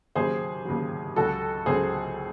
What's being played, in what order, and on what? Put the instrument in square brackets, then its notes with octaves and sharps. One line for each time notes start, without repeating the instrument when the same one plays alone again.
[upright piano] D#2 C#3 F#3 G#4 C5
D#2 C#3 F#3
C#2 C#3 F#3 F#4 A4
C#2 C#3 F#3 G#4 C5